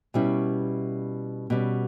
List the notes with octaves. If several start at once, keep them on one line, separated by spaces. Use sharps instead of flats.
B2 G3 C#4 E4
B2 G3 C#4